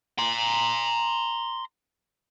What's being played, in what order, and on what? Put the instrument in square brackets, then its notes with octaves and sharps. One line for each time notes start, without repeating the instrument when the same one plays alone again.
[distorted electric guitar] A#5 C6